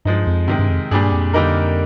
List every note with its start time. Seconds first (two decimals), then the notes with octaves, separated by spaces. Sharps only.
0.05 G2 F3 G#3 D#4
0.27 F2
0.48 G2 C3 D#3 G#3
0.59 G2
0.69 F2
0.91 G2 A#2 G3 D4 G#4
1.12 F2
1.34 D3 G3 A#3 D#4 A#4